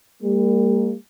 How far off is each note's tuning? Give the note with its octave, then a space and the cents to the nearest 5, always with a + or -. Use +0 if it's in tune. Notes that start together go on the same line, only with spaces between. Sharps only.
G3 +35 A#3 -25